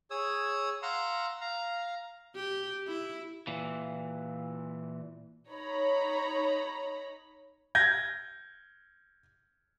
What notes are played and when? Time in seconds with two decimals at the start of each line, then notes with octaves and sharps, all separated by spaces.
0.11 G#4 C#5 D#6 E6
0.82 F5 F#5 A#5 C6 E6
1.41 F5 A#5
2.36 G4
2.88 E4
3.47 A#2 E3
5.50 D#4 C#5 A#5 B5
7.75 G6 G#6 A#6